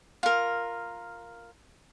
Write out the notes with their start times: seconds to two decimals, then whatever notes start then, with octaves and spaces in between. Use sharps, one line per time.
0.23 F4 A#4